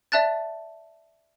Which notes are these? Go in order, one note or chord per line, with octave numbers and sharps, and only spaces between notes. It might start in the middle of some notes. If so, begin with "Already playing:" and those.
D5 E5 A5 F#6 A6